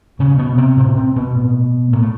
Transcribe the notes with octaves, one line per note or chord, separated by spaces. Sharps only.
A2 C#3 C#4
B2 B3
C3 C4
A2 C3 C4
C3 C4
B2 B3
A2
A2 A#3
A3